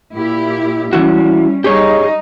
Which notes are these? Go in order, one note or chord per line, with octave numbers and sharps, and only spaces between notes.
A#2 E4 G4
E3 G3 C#4 E4 F#4
G3 D#4 G4 G#4 C#5